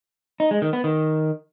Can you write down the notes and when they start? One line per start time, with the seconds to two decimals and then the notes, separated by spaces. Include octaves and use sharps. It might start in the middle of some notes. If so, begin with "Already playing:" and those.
0.40 D#4
0.51 G#3
0.62 D#3
0.73 B3
0.84 D#3